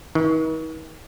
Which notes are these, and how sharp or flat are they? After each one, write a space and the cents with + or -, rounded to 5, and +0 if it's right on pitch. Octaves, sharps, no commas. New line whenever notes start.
D#3 +45